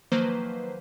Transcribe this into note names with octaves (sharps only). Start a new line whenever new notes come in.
D#3 F3 F#3 A#3 B4 C5